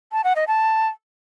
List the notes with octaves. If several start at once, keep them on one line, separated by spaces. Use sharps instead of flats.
A5
F#5
D#5
A5